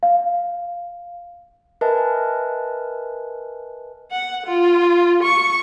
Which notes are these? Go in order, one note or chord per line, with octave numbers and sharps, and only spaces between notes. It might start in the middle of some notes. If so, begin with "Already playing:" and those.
F5
A#4 B4 D#5 E5 G#5 A5
F#5
F4
C#6